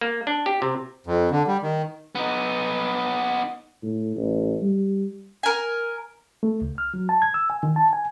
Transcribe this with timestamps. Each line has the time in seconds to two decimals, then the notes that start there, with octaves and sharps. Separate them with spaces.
0.01 A#3
0.27 D4
0.46 G4
0.62 C3
1.07 F2
1.31 D3
1.47 G3
1.62 D#3
2.15 B3 D#4
3.83 A2
4.16 A1
4.62 G3
5.43 A#4 G#5
6.43 A3
6.62 C#2
6.78 F6
6.94 F#3
7.09 A5
7.22 G#6
7.34 E6
7.50 G#5
7.63 D#3
7.76 A5
7.93 G#5